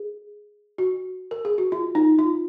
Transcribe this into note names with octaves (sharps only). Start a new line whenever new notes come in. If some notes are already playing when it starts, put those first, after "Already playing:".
Already playing: G#4
F#4
A#4
G#4
F#4
F4
D#4
F4